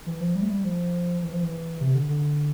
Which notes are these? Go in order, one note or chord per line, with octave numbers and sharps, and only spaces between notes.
E3
F3
G3
A3
G3
F3
E3
F3
E3
C3
D3
D3